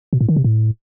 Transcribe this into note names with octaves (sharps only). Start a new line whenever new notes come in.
B2
A2
D#3
C3
A2